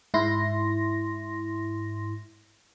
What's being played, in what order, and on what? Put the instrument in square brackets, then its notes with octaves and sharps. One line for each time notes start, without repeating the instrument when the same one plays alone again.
[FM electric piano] G#2 E4 C6 A#6